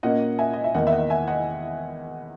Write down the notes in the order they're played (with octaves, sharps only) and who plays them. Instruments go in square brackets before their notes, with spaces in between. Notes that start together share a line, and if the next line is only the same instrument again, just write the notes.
[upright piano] A#2 A#3 C#4 D#5 F#5
E5 G#5
D#5
E5
E2 D#3 A#3 D#5 F#5
E5
D#5 F#5
E5 G#5
D#5 F#5